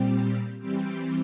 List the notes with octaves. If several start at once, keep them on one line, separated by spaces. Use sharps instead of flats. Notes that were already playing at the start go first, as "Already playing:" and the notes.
Already playing: A#2 G3 C4 G4
E3 G3 C4 G4